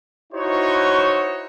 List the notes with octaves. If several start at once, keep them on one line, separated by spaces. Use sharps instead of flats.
D#4 E4 F#4 C5 C#5